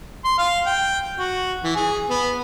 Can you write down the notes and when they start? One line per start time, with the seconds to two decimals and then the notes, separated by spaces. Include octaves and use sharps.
0.25 C6
0.38 F5
0.66 G5
1.18 F#4
1.64 E3
1.76 G#4
2.10 B3